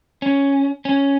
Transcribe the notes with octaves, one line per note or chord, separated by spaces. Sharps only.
C#4
C#4